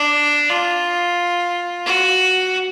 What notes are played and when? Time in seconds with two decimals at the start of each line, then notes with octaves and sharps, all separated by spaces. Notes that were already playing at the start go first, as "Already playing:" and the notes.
Already playing: D4
0.49 F4
1.85 F#4